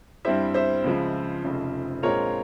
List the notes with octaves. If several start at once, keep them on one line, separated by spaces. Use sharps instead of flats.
G2 G3 C4 E4 C5 E5
C5 E5
C#2 C#3 F3 G#3
F1 F2 C#3
A#1 A#2 G#3 C4 F4 A#4 C#5